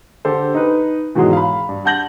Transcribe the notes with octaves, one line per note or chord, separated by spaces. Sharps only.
D3 G4 A4 C5
D#4 B4
G#2 B2 D#3 E3 F#3 G#3
F5 B5
G2
F#5 A5 G6 A#6 F#7